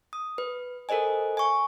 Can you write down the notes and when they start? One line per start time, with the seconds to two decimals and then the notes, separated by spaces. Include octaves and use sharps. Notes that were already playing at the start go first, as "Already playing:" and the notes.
0.13 D#6
0.38 B4
0.89 A4 A#4 C5 D#5 G#5
1.37 G#5 C#6